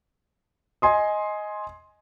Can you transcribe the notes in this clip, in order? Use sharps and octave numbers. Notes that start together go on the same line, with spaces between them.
D#5 G#5 C6 D#6